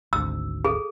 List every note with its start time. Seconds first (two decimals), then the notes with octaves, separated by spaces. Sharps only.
0.13 G#1 D2 E6
0.65 G#4 A4